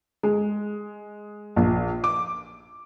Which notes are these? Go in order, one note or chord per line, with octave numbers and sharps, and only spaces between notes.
G#3
A#1
D6